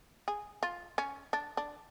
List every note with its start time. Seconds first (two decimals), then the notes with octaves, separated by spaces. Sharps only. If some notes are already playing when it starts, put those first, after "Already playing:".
0.28 G#4
0.63 F4
0.98 C#4
1.33 D4
1.57 D4